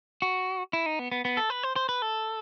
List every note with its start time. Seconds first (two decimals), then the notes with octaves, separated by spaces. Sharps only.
0.22 F#4
0.73 E4
0.86 D#4
0.99 B3
1.12 B3
1.25 B3
1.37 A4
1.50 B4
1.63 C5
1.76 C5
1.89 B4
2.02 A4